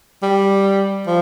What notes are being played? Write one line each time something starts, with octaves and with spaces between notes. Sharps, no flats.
G3
F3